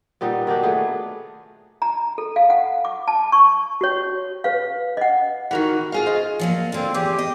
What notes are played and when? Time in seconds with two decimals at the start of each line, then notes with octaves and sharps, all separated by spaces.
0.21 A#2 G3 B3 D#4
0.47 D#3 F#3 D4 G4
0.63 A3 B3 G#4
1.82 A#5
2.18 A4
2.36 F5
2.50 F#5
2.85 D6
3.08 A5
3.32 C#6
3.81 F#4 C#5
4.44 B4 F5
4.97 D#5 F#5
5.51 D#3 E3 F#4 A#4 F#5
5.92 F4 G#4 F5
6.06 C5 D#5
6.39 F3 F#3 A#3
6.72 D3 A#3 C4
6.94 E2 G4 G#4
7.18 D#5